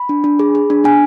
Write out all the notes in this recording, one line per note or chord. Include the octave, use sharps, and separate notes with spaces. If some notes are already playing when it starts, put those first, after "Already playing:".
Already playing: B5
D4
D4
G#4
G#4
D4
D4 G#5